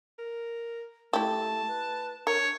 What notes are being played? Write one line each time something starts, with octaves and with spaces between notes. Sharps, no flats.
A#4
A3 E4 G4 A5
B4
D4 A#4 C#5